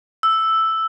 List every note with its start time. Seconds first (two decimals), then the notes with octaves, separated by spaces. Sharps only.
0.23 E6